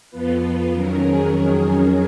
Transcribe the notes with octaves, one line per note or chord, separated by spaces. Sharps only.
F2 F3 B3 F4 B4
F2 D#3 F#3 C#4 A#4
G#4